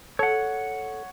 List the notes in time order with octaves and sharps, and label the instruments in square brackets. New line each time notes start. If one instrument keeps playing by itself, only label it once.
[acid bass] A4 [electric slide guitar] C#5 F#5